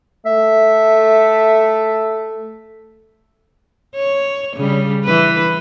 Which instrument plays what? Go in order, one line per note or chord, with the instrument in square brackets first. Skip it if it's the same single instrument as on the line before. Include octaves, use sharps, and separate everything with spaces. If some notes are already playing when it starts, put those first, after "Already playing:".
[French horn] A3 [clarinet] E5
[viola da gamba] C#5
C#3 G3
E3 B4